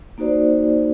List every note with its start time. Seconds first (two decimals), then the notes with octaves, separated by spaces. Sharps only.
0.18 A#3 D#4 F#4 C5 D5